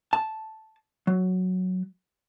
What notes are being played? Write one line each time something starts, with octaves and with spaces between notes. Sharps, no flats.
A5
F#3